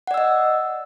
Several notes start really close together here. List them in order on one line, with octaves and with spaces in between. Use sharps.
F#5 D5 E6 D#5